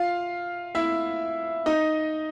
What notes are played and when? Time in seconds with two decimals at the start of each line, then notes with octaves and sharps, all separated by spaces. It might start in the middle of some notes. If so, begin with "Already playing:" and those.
Already playing: F4 F5
0.75 E4 E5
1.66 D#4 D#5